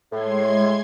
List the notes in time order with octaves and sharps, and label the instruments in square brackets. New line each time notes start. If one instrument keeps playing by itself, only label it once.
[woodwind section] A2 [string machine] G#3 C6 G#6